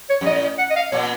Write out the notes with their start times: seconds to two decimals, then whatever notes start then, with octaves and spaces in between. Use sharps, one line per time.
0.09 C#5
0.21 F#2
0.26 A2 D#5
0.59 F#5
0.70 D#5
0.76 F5
0.92 A#2 C#5